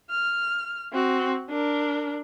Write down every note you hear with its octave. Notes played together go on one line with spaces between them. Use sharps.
F6
C4 F#4
D4 A#4